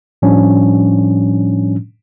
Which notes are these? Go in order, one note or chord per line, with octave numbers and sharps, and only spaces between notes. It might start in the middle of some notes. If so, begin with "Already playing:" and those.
A2 F3 G3 C#4 D4